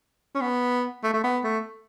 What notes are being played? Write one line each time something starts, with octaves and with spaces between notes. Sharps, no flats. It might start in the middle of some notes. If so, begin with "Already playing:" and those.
C#4
B3
A3
A3
B3
A3